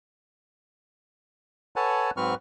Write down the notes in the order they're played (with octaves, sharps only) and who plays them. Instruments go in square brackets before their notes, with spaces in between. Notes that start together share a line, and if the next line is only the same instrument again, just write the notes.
[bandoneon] A4 B4 C#5 F#5 G#5 A5
G#2 F#3 C4 B4 C#6 F6